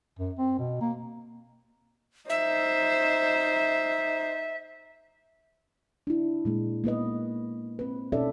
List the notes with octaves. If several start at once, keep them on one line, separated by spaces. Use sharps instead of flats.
F#2
C4
B2
A#3
D#4 C5 E5
D4 E4
A#2 G#3 A#3
A#3 B3 B4 D#5
C4 B4
B2 C#4 D#4 A4 D5 E5